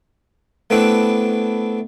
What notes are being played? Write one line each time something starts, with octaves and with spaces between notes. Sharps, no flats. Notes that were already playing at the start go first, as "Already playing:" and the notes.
A3 B3 C4 D4 E4 B4